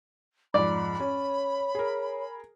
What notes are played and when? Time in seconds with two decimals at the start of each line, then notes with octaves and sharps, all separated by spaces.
0.54 F2 G#2 D5 B5
1.00 C#4 C#5
1.75 G#4 A#4